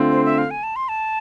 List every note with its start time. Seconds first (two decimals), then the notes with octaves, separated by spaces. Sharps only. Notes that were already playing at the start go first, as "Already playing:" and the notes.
Already playing: D3 A3 C4 F4
0.12 C5
0.25 E5
0.38 F5
0.51 G#5
0.63 A5
0.76 C6
0.89 A5